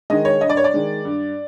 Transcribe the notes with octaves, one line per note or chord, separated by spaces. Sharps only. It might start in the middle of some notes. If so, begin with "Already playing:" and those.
D#3 G#3 D#5
C#5
G2 D#5
D5
C#5
D5
D#3 G#3
G2